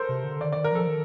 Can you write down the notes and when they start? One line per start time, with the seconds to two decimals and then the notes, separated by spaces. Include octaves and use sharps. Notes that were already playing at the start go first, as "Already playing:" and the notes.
Already playing: A4 A#4 C5
0.09 C3
0.24 D3
0.40 D#3 D5
0.51 D3 D5
0.56 D#3
0.64 A#4
0.72 F3 A4
0.87 D#3